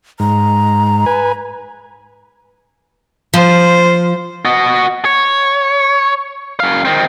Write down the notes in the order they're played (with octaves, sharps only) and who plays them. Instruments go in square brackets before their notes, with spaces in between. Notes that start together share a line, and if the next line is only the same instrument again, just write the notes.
[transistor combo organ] G#2 [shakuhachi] A#5
[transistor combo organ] B4 G#5
[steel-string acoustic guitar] F3 [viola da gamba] C5
[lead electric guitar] F#4 D#5
C#5
F#2 F5
D#3 C4